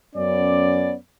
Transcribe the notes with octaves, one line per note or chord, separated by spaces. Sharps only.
F#2 B3 C#4 D5